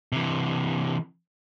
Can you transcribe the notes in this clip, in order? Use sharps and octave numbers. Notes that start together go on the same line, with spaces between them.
C3 E3